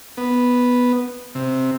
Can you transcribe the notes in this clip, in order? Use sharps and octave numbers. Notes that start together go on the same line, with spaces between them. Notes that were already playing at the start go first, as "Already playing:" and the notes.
B3
C3